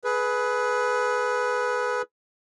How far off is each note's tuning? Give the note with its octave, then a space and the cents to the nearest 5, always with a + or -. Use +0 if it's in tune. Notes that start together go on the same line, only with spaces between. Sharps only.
G#4 +25 B4 +0